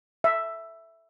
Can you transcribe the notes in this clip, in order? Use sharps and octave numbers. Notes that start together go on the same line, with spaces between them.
E5